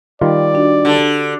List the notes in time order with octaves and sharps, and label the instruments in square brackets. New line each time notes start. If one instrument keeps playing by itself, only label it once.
[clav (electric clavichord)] D#3 G3 F4 [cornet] D5
[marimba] D4 F#4
[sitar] D3 [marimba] G4 A5